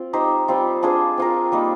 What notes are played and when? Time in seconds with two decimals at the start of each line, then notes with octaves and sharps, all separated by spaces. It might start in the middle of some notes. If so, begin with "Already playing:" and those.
Already playing: C4 F4
0.13 D#4 G4 C5
0.48 G3 C4 F4
0.83 D4 F4 G#4 C5
1.18 C4 F4 A#4
1.52 G3 A#3 D#4